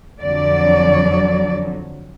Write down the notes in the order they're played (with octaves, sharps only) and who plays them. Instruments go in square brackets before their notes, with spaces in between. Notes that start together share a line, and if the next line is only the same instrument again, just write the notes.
[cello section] F2 D3 F#3 D5